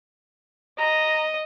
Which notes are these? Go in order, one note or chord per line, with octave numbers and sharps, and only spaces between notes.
D#5 A#5